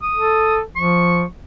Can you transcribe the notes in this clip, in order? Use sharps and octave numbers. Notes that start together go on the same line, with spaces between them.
D#6
A4
F3 C#6